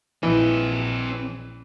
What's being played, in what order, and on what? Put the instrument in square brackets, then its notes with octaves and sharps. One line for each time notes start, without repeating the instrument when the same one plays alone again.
[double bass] A#1 [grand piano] E3 [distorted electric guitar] C4 D#5